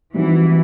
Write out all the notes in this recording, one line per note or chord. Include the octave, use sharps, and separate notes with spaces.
E3 G3 C4 D#4 F#4